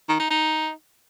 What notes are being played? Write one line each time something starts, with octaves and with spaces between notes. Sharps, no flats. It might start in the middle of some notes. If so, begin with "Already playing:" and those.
D#3
D#4
D#4